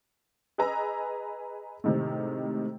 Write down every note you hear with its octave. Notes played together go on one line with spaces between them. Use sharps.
G#4 B4 D#5 G#5 A#5 E6
A2 C3 D#3 G#3 A3